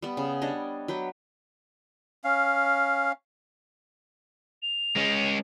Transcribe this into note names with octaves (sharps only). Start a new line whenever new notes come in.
G3 B3
C#3
G3 D4 C#5 D#5
F#3 B4 G5
C#4 F5
F7
G#3 C#4